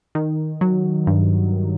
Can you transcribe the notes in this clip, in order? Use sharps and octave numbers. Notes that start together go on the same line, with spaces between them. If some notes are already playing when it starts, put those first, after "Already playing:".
D#3
F#3
G2